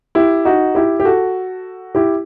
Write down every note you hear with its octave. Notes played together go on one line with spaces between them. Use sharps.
E4 G4
D#4 F#4
E4 G4
G4
F#4 A4
E4 G4